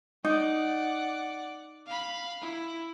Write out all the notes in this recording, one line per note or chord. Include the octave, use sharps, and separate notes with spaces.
D#4 D5 F#5
F5 B5
E4